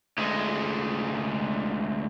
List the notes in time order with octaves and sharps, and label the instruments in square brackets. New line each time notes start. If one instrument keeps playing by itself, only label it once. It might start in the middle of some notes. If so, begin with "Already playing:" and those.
[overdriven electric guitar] D2 G#3